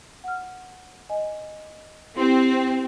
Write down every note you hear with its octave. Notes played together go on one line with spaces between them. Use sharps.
F#5 F6
D#5 G#5
C4 E4 G4 C6